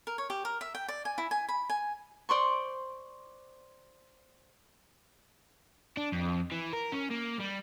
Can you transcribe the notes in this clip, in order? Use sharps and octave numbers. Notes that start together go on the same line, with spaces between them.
A#4
C#5
G4
A#4
E5
G5
D5
G#5
E4
G#5
B5
G#5
C5 D5 C6 C#6
D4
F2
E3
A#4
C#4
A#3
G3